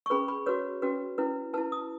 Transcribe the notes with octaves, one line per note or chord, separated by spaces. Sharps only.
C#6
C#4 G#4 B4 B5
B5
F#4 B4 C#5
C#4 F#4 B4
C#4 E4 B4
E4 B4 A5
D#6